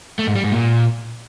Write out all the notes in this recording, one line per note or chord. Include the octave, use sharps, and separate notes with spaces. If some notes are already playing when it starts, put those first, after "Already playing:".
A3
G#2
G3
G#2
A#2